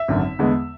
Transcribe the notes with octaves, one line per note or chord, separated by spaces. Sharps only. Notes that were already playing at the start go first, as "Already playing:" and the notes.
Already playing: E5
G#1 F#2 D3
E2 D3 G#3 B3